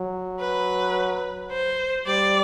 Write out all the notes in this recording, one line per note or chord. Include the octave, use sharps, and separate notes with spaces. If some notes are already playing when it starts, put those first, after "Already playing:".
Already playing: F#3
B4
C5
G3 D5